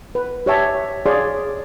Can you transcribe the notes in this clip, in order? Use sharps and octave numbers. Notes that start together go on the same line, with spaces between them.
B4
G4 C#5 E5 A5
G#4 C#5 D5 F5 C6